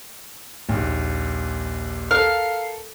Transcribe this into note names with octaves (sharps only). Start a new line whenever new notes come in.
A#1 D#2
A4 A#4 F5